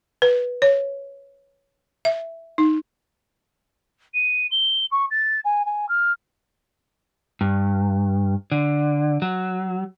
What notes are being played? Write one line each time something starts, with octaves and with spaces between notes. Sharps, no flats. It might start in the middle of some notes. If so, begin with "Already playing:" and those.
B4
C#5
E5
D#4
D#7
G7
C#6
A6
G#5
G#5
F6
G2
D3
F#3